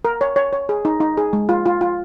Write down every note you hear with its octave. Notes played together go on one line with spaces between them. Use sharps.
A#4
C#5
C#5
C#5
G#4
D#4
D#4
G#4
G#3
F4
F4
F4